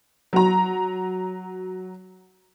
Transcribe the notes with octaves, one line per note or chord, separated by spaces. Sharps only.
F#3 A#5